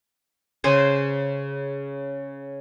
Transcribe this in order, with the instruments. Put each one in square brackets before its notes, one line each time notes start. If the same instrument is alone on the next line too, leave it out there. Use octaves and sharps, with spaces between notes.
[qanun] C#3 G#4 C5 G#5